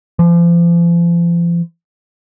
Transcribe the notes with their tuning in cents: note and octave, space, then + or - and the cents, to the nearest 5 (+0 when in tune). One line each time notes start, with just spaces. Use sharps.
F3 -40